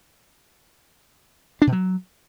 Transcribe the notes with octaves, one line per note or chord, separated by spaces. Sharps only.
D4
B2
F#3